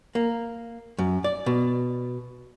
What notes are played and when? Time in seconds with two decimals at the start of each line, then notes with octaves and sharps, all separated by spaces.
0.15 A#3
0.99 F#2
1.24 D5
1.46 B2